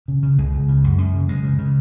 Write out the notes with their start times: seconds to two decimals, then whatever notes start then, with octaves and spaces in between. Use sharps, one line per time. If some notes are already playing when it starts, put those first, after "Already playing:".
0.08 C#3
0.23 C#3
0.38 C#2 G#3
0.53 C#2
0.68 C#3
0.84 F#2
0.98 F#2
1.14 C#3
1.29 C#3 G#3
1.44 C#3
1.59 C#3